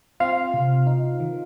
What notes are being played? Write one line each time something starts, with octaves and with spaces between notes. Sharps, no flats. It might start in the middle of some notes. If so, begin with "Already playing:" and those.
C4 F4 F5
C3
D#4
D#3